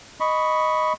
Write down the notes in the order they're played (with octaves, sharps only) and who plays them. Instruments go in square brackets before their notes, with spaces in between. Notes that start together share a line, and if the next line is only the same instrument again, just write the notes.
[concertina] D#5 B5 C#6